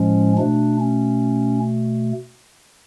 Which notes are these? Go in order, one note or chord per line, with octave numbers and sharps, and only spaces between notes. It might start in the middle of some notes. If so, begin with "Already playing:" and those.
Already playing: A2 F3 G#3 C#4
B2 A3 D4
C#4